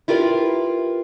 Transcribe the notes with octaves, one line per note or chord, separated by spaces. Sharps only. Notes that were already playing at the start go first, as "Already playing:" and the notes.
E4 F4 G4 A#4 B4